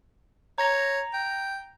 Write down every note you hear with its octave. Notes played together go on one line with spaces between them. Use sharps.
C#5 A#5 A#6 F7
G5